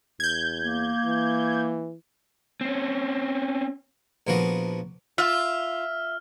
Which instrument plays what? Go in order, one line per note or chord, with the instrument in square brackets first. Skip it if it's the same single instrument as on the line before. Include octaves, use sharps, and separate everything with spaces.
[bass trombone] E2 [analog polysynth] G6 G#6
[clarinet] A#3
[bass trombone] E3
[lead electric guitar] C4 C#4
[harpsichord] A#1 F3 A#3 B3 F#4 D#5
[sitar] F4 [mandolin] E5 [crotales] F6